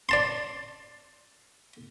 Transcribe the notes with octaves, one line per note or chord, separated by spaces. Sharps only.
D5 A5 C6